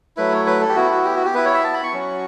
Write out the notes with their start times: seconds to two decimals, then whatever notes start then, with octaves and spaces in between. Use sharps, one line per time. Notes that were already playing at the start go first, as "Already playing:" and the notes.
0.17 F#3 A3 E4 B4
0.32 C#5
0.46 B4
0.61 A4
0.69 G4
0.75 B3 E4 F#4
0.91 F#4
1.05 G4
1.16 F#4
1.25 G4
1.34 B3 E4 B4
1.45 C#5
1.54 E5
1.64 A5
1.74 B5
1.83 C#6
1.93 F#3 C#4 F#4